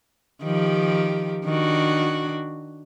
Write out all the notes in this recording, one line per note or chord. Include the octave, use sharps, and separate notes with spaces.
D#3 F3 G4
D#3 D4 F#4